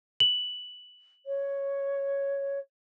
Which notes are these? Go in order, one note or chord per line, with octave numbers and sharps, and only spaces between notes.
F#7
C#5